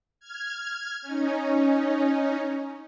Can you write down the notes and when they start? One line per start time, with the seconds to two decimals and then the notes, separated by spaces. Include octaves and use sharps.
0.20 F6 G#6
1.02 C#4 D#4